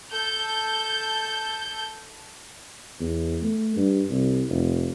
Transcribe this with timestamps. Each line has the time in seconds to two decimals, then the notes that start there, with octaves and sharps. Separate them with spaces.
0.11 A4 G6
3.00 E2
3.43 A3
3.76 G2
4.10 C2
4.49 F1